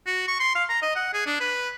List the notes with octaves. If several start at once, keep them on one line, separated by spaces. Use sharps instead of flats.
F#4
C#6
C6
F5
A#5
D#5
F#5
G#4
D4
B4